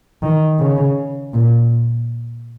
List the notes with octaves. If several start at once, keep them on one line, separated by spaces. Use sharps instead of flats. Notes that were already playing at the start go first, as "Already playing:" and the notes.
D#3
C#3
A#2